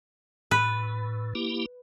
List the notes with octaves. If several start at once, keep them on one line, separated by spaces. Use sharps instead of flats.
A2 B4
A#3 E4 G4